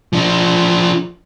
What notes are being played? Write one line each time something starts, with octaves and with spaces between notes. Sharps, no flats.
F3 D4